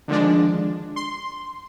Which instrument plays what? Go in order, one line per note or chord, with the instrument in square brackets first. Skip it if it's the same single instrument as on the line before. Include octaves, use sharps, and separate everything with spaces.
[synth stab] D3 D#3 F3 G#3 D4
C6